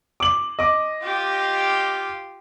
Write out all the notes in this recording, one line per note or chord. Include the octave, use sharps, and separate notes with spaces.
D6 F#7
D#5 D6
F4 G4